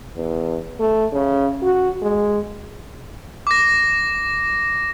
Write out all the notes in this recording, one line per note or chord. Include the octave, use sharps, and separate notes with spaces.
E2
A3
C#3
F#4
G#3
D6 A#6